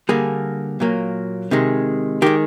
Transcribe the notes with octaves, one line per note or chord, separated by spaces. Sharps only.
D3 G3 A#3 G#4
A#2 F#3 A#3
C3 D#3 G#3
D#3 G#3 G4